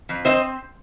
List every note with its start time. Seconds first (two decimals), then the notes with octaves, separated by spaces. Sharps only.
0.09 F2
0.25 C4 C5 D#5